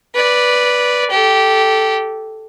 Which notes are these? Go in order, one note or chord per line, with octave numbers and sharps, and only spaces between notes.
B4 D5
G4 A4